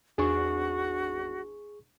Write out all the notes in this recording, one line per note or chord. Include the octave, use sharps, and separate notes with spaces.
G#1 E2 D4 F#4 G#4 C#6